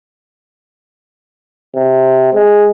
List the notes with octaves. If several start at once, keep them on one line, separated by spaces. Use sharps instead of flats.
C3
G#3